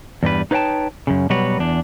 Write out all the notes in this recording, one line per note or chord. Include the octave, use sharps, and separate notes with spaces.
E2 G2 G3 B4
D#4 B4 C#5 F5 G5 A5
F#2 C#3
B2 F#3 G3 F#4 B4 C#5
E2 D4